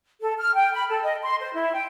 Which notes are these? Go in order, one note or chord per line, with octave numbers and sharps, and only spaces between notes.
A4
F6
G5
B5
A4
D#5
C6
C5
E4
G5